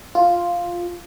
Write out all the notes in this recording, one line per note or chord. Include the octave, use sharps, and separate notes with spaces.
F4